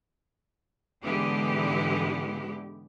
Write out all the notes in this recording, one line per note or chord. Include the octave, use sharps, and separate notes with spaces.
G#2 D3 E3 G#3 B3 G4